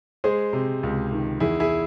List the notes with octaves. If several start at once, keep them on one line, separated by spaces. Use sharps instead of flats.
G#3 G#4 C5
C3
C#2
D#3
E2 E4 G#4
E4 G#4